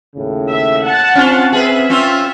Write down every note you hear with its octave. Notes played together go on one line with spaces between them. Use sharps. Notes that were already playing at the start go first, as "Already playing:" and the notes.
D#2 A2 C#3
E5
F#5 A5
C4 C#4 F4
G#4 B4 E5
C4 C#4 F4